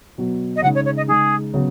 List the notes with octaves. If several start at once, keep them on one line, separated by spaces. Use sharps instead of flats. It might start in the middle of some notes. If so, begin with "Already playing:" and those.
B2 F#3 B3 F#4
D#5
C#3 G#3 D#4 F#5
C#5
C#5
D#5
C#3 G#3 D#4 G#4
C#3 F#3 B3